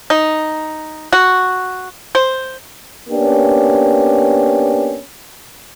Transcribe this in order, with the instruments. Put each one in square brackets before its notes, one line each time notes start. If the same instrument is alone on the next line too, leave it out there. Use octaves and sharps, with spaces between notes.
[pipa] D#4
F#4
C5
[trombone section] A#3 B3 C#4 D4 G4